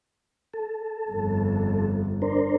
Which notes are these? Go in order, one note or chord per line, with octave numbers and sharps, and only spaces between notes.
A4
G1 F2
D4 A#4 C5